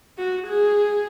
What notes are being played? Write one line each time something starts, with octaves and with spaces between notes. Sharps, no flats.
F#4
G#4